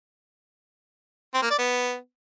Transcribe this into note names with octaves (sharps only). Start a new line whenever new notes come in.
C4
A#3
D5
B3